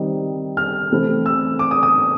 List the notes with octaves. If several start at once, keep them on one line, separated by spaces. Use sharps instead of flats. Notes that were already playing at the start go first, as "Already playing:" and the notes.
Already playing: D#3 G3 C4 D#4
F6
C3 E3 A3 C4 E4
E6
D6
D#6
D#6